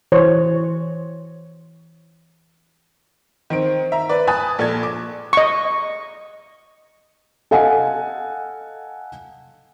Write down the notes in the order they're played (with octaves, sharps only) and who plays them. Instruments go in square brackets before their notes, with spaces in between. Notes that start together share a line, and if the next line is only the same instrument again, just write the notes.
[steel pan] E3 C5 C#5
[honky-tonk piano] D#3 C4 D7
E5 A#5
B4 D5
G#5 A5 B5 D#6 F#6 A6
A#1 A4 A5 G#6
D6
[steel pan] D#5 C#6
[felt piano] A4 D#5 F5 F#5 G#5